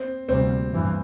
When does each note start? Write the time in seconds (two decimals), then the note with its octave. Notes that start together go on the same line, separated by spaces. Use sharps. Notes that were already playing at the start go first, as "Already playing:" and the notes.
Already playing: C4 C5
0.29 D2 C3 G3 C4 C5
0.72 G2 E3